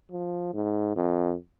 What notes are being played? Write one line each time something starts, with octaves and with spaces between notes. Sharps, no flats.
F3
G#2
F2